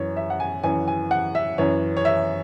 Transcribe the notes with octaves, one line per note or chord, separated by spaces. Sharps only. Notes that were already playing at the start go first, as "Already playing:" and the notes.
Already playing: F#2 E3 C#5
E5
F#5
G#5
F#2 E3 G#5
G#5
F#5
E5
F#2 E3 C#5
C#5
E5